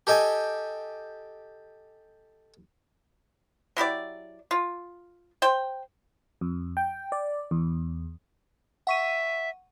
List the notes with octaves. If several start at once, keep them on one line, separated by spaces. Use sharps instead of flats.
G4 A4 D#5 G5 G#5
F#3 E4 G4 D5
F4
C5 G5
F2
G5
D5
E2
E5 F#5 C#6 D#7